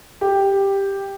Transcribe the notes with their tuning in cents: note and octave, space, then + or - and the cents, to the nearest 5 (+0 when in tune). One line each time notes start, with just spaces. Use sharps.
G4 +5